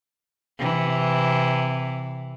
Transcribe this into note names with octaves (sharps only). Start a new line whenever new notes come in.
C3 E3